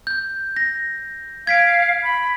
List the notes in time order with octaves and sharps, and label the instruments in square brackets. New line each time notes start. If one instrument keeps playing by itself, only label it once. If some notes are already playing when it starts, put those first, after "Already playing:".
[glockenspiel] G6
A#6
[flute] F5 [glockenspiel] G#6 B6 D7
[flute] B5